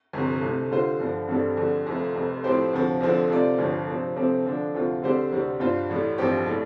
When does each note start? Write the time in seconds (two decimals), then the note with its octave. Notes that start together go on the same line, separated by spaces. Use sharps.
0.13 G1 F2 C3
0.42 C2 C3 A3
0.71 D3 G3 F4 C5
1.00 G2 D3 F3
1.28 A1 G2 G3 C4 A4
1.57 F2 D3 G3
1.86 F1 F2 F3 A3
2.14 F1 F2 C3
2.44 A2 F3 C4 G4 C5
2.73 D2 C3 F3
3.01 F2 D3 F3 C4
3.30 C3 A3 F4 D5
3.58 G1 G2 F3
3.88 C3 F3 C4
4.16 C3 F3 A3 C4 G4
4.46 D3 F3 D4
4.74 D2 C3 F3 A3 F4
5.02 D3 G3 C4 G4 C5
5.32 D2 C3 G3 C4
5.60 G2 G3 F4 C5
5.90 A1 A2 G3
6.18 A1 G2 F3 C4 G4
6.46 A2 G3